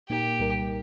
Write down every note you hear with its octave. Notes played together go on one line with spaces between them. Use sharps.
A#2 A#3 D#4 G4 A#4
C2 A#2 G3 D#4 A#4